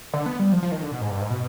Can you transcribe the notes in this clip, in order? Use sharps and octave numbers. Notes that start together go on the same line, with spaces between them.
D3
B3
G3
F3
F3
D#3
D3
B2
G#2
G2
G#2
B2